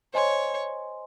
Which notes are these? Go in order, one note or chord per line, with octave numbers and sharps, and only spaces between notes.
C5 C#5 D#5 G#5 C6